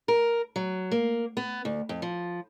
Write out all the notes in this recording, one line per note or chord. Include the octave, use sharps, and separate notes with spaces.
A#4
F#3
A#3
B3
D2
F2
F3